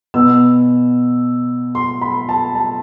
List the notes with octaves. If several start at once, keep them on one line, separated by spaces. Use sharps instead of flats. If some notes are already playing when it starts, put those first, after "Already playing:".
B2 B3 E6
C6
B5
A5
A5